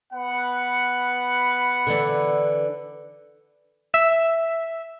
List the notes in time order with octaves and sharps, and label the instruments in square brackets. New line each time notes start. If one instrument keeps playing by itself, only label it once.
[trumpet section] B3 B4 F#5
[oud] D3 E3 D4
[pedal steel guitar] E5